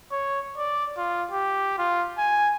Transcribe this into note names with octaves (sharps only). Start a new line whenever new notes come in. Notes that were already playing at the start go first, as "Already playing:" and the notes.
C#5
D5
F4
G4
F4
G#5